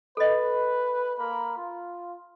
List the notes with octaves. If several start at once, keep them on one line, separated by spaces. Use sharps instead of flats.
A4 B4 D#5
A#3 A#4 B5
F4